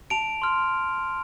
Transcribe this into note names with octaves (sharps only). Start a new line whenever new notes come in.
A5 D7 F7
C6 F6